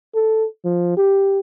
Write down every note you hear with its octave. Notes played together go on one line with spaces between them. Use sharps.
A4
F3
G4